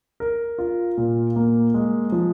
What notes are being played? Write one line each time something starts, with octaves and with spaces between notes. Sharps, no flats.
A#4
F4
A#2
A#3
G#3
F3